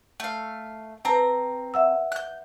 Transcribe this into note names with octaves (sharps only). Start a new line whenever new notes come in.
A3 F5
C4 B4 A5 A#5
E5 F#5 E6
F#6 G6